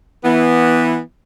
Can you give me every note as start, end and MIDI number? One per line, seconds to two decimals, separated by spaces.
0.24 0.98 52
0.24 0.98 59